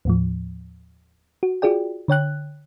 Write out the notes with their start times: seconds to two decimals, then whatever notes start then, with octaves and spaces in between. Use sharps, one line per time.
0.05 D#2 A2 F3
1.43 F#4
1.62 F4 F#4 G#4 D5 G5
2.08 D3 C#5 G5 F#6